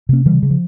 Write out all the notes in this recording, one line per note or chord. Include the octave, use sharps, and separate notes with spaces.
C3 A#3 C#4
C#3 E3 G3
C#3
F3